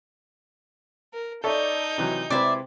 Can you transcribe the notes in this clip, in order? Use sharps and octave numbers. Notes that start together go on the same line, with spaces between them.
A#4
D#4 A4 C#5 D5 E5 G6
C3 E3 F#3
C3 G#3 C4 E4 B4 D5 E5